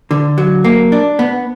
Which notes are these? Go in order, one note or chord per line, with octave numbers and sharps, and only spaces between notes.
D3
F#3
A#3
D4
B3